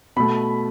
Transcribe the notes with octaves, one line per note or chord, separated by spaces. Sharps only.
B2 A3 B5